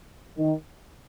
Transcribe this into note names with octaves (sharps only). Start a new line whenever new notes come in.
D#3